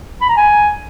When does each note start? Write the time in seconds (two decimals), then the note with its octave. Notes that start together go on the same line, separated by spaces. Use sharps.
0.21 B5
0.29 A#5
0.37 G#5